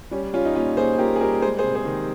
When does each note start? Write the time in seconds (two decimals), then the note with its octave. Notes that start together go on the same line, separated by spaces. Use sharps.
0.11 G3 C#4
0.34 G3 C#4 F4
0.45 D#4
0.55 A#2 C#4 F4
0.77 A#2 G#4 C5
0.98 A#2 G4 A#4
1.16 G#4
1.20 G3 G4 A#4
1.42 G#3 G#4 C5
1.59 G#4 C5
1.63 C3
1.75 G#4 C5
1.85 D#3